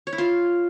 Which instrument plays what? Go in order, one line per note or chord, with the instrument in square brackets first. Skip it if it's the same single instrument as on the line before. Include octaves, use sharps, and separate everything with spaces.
[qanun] C#5
E4
F4